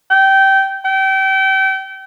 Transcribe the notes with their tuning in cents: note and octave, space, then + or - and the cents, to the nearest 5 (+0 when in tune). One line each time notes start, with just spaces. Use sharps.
G5 -20
G5 -30